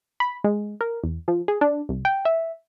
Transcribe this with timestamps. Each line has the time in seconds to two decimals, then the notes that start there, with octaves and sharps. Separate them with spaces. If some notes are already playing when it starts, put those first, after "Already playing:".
0.20 B5
0.44 G#3
0.81 A#4
1.04 E2
1.28 F3
1.48 G#4
1.61 D4
1.89 C2
2.05 G5
2.25 E5